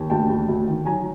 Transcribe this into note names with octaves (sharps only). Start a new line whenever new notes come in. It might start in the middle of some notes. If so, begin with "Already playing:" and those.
Already playing: D#2
D2 G5 A5
D2
D2
D#3
F#3 G#5 A#5